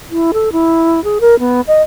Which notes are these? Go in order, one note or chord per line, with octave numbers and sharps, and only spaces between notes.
E4
A4
E4
G#4
A#4
B3
D#5